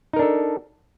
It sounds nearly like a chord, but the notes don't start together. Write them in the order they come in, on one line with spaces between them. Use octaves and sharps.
D#4 A#4 D4 A4